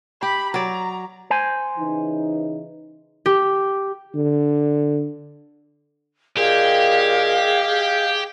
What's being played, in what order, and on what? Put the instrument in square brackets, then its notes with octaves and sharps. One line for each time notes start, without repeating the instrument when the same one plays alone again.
[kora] G4 [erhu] B5
[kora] F#3 D5 [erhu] A#5
[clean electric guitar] C5 G#5
[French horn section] C#3 E3 D#4
[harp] G4
[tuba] D3
[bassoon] A#2 [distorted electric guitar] G4 [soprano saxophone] G#4 [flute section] D#5 F5